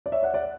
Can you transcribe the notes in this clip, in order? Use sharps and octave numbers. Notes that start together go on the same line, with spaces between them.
D5
C#5 E5
D5 F#5
D5 F#5